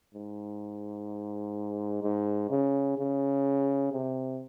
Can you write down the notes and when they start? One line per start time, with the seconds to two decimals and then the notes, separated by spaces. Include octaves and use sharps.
0.14 G#2
2.03 G#2
2.50 C#3
2.98 C#3
3.92 C3